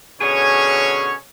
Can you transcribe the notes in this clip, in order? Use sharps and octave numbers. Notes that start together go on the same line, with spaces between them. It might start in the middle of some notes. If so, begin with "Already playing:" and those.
B2 D3 C#4 G#4 C#5